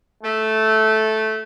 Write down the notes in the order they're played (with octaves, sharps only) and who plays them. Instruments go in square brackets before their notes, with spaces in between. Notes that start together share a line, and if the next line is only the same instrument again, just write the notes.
[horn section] A3